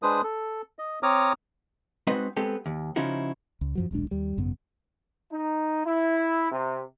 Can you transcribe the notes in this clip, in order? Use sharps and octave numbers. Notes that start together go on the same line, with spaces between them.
G#3 D4 B4 C5 D#6
A4
D#5
C4 C#5 A#5 D6 D#6 F6
G#3 C4 D#4 F#4 B4 D#5
G#3 B3 C4 G4 A4
D#2
C#3 F3 C#4 D#4 E4 F#4
C#2
F#2 F3 F#3
D#1 B1 G#3 D4
D#2 G3
G#1 F#2 C#3 B3
D#4
E4
C3